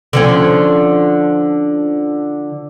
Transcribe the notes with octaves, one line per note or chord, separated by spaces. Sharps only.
D3 F3 C#4